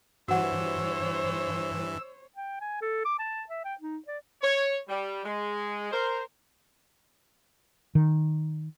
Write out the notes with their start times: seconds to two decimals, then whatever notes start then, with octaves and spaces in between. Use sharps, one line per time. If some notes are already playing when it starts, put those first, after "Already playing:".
0.28 G2 E3 F#4 C5 C#5 F#5 E6
2.36 G5
2.61 G#5
2.82 A4
3.05 D6
3.19 A5
3.49 E5
3.65 G5
3.81 D#4
4.07 D5
4.42 C#5
4.89 G3
5.24 G#3
5.92 A#4 C5
7.95 D#3